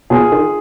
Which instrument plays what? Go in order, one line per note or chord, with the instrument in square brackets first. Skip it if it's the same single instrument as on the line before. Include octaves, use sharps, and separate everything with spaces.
[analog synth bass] B2 [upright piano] F4 G#4
[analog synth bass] D#3